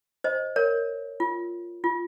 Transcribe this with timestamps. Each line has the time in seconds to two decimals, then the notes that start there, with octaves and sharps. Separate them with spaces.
0.24 C5 D#5
0.56 A#4 C#5
1.20 F4
1.84 F4